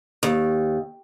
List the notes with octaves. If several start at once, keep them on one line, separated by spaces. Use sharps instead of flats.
D#2